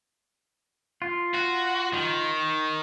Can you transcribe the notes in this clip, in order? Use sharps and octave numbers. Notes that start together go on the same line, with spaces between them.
F4
F#4
D#3